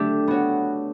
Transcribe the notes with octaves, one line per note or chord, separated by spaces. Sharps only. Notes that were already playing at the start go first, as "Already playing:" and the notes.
Already playing: A3 D4 G4
B3 F#4 C#5